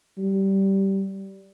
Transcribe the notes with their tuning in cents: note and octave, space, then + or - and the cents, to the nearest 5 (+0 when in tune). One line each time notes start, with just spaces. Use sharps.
G3 -15